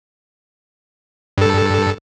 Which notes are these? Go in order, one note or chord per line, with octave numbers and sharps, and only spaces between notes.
G2 A4